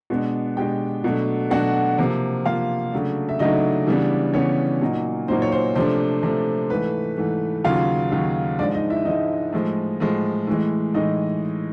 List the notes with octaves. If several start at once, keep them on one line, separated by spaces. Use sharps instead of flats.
B2 G#3 B3 D4
B2 G#3 B3 D4 G4 G5
B2 F#3 A3 D4
B2 F#3 A3 D4 F#4 F#5
C3 F3 A#3
C3 F3 A#3 F4 F5
C#3 F#3 A3 D4
E5
C#3 F#3 A3 D4 D#4 D#5
C#3 E3 G3 B3 D4
C#3 E3 G3 B3 C#4 D4 C#5
A#2 F#3 A#3 D#4
A#2 F#3 A#3 D#4 C5
C#5
C5
C3 F3 A3 D4 C5
C3 F3 A3 D4
G#2 E3 A3 B4
G#2 E3 A3
D#2 C#3 F#3 F4 F5
D#2 C#3 F#3
G#2 F3 G#3 D4 D5
D#4 D#5
E4 E5
G#2 F3 G#3 D#4 D#5
A2 F3 G#3
A2 F3 G#3
A2 E3 G#3
A2 E3 G#3 D#4 D#5